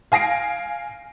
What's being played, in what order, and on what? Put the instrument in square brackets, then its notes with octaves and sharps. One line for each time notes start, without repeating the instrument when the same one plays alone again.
[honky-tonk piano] F5 G#5 A#6 C7 D7